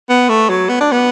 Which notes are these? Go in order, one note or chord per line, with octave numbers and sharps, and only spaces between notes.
B3
A3
F#3
B3
D4
B3